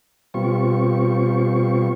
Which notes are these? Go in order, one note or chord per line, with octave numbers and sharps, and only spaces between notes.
B2 G3 C4 F4 C#6